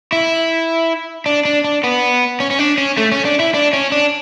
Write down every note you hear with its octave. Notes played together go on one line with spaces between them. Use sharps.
E4
D4
D4
D4
B3
C#4
C#4
D4
C#4
A3
C#4
D4
E4
D4
C#4
D4